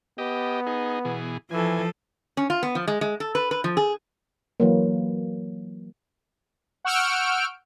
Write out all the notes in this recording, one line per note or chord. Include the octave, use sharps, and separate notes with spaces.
B3 G4 D#5
D#4 G#4
B2 E3 G#4
E3 F3 A4 G#5
C#4
F4
B3
F3
G#3
G#3
A4
B4
B4
F3
G#4
E3 F#3 A#3
F#5 C#6 E6 F6 G6 D7